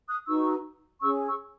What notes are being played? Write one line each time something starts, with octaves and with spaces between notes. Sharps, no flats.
D#6 F#6
D#4 F#4 B4 C#6 E6
C#4 G#4 C#5 C#6 E6
C#6 E6